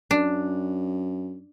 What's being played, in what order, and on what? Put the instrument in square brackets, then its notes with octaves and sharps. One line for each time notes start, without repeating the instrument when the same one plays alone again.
[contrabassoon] F#2 [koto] D4